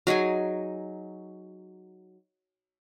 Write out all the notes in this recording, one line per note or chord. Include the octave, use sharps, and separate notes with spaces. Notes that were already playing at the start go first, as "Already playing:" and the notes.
F#3 D#4 G#4 G#5